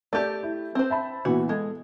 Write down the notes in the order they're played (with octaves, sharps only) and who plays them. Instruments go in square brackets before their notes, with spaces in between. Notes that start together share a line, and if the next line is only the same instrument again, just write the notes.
[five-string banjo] A3 G4 [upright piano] D5 G6
[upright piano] E4
[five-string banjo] C4 C5
[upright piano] E5 A5 B5
[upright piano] A#2 E3 B3 [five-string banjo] F#4
[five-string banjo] G#3 [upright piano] A4